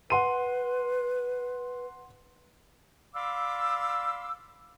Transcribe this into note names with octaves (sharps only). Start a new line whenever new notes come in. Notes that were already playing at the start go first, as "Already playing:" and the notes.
B4 F#5 C6 D#7
D5 F5 B5 C6 D6 E6